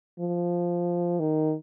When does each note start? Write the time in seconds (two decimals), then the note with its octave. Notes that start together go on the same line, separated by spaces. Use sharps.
0.20 F3
1.20 D#3